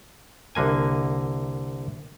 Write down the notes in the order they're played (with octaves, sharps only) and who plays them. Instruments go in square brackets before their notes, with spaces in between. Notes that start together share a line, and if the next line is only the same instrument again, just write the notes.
[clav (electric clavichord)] C2 D3 A#3 G#5